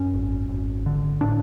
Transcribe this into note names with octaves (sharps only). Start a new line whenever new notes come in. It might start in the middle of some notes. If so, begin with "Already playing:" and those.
Already playing: F#2 C#4
G#1
G#1
D3
A2 D4